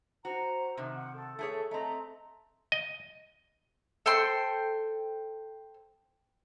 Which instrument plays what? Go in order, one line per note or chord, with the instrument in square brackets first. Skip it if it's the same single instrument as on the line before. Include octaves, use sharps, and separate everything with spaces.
[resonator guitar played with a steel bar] F#4 [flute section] C5 A#5
[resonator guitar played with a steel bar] C3 D#3
[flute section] F#5
A4
[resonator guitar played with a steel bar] A3 G#4 C#5
[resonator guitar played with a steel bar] A3 C4 [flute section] D#5 A#5
[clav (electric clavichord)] D#5
[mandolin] A4 C5 G5 C6